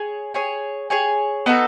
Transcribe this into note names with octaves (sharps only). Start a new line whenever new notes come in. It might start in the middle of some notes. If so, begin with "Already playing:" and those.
Already playing: G#4 C#5 G#5
G#4 C#5 G#5
G#4 C#5 G#5
B3 D#4 F#4 A4